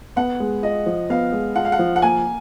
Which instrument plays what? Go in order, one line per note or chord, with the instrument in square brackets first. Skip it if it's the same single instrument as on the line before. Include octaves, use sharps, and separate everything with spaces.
[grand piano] B3 [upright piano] F#5
[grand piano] G#3
[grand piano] F4 [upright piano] D#5
[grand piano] F3
[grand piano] B3 [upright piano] F5
[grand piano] G#3
[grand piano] F4 [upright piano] F#5
[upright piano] F5
F#5
[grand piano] F3
[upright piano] F#5
[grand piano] A#3 [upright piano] G#5